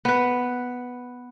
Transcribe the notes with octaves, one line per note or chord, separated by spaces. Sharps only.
B3 B4